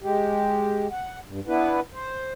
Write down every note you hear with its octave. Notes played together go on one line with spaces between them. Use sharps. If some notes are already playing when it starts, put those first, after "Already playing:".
G#3 G4
F#5
G2
B3 D4 E4 B4
C5